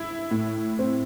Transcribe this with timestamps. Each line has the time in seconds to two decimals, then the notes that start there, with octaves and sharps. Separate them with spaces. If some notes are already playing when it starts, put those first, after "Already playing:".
Already playing: E4
0.31 A2
0.79 C4